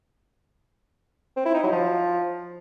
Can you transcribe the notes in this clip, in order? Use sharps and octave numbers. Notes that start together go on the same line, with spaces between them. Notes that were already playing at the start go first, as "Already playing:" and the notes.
C4
E4
D#4
F#3
F3